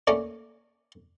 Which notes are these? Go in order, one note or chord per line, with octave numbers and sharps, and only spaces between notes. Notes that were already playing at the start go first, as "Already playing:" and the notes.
A3 A#3 C#4 D5